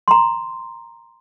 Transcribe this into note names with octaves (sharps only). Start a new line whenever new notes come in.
A#5 C6